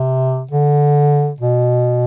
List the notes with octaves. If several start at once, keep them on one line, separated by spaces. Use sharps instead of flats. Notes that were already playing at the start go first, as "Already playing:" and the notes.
Already playing: C3
D3
B2